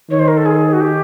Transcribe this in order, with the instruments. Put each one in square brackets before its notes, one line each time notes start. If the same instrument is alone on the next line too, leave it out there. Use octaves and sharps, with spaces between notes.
[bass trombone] D#3 [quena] C#5
[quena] C5
A#4
A4
G#4
F#4
G4